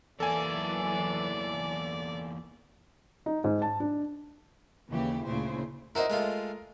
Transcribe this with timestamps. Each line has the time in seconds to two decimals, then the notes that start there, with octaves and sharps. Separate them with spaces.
0.20 E2 E3 F#3 A#3 A4 D5 G#5
3.26 D#4
3.44 G#2
3.62 A5
3.80 D4
4.88 D#2 C#3 E3 G4
5.24 D2 A#2 C#3 E4 C5
5.95 E4 F#4 A#4 C5 D#5
6.10 G#3 A3 F4